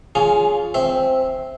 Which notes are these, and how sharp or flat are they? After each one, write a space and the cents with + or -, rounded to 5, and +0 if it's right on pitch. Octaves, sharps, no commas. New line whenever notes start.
C#4 +25 F4 +0 G#4 +0
C4 +0 E5 +0